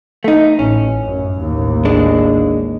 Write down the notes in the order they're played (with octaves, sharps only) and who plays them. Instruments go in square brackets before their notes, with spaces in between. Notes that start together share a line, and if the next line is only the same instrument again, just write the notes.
[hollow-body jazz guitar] A3 D#4
[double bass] A1 [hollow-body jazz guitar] C#4
[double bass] F#2
A1 D#2
[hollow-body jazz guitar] G#3 D4